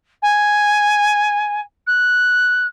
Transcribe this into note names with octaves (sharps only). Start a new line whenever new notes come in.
G#5
F#6